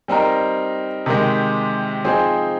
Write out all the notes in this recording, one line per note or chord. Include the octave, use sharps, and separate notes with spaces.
G3 C4 D#4 A#4
C3 D#3 G#3
F3 C4 D#4 G#4 C5